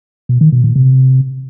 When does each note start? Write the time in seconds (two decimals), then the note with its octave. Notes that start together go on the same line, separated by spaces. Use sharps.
0.29 B2
0.41 D#3
0.52 B2
0.64 A#2
0.76 C3